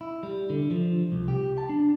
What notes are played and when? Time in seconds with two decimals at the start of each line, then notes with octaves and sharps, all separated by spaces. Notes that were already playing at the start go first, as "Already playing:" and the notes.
0.01 E4
0.23 G3
0.50 D3
0.71 F3
1.12 C2
1.28 G4
1.58 A5
1.69 D4